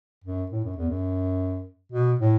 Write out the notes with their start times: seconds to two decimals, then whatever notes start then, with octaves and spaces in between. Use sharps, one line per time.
0.24 F#2
0.52 A2
0.64 F#2
0.77 E2
0.89 F#2
1.92 B2
2.21 A2